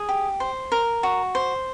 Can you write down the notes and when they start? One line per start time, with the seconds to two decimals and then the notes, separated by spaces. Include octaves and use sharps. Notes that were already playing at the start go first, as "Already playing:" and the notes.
Already playing: G#4
0.09 G4
0.40 C5
0.72 A#4
1.03 F#4
1.35 C5